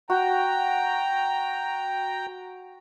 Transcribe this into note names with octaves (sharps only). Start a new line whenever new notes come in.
F#4 G5 A#5